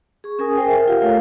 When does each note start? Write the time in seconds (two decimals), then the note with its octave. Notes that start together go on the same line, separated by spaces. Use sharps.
0.24 G#4 C#6
0.39 C#4 G#4 A#4 G#5 D#6
0.56 A#4 C5 G5 G#5
0.68 E5
0.88 F4 G4 A#4 F5 F#5
1.02 A3 F4 A4 C#5 F5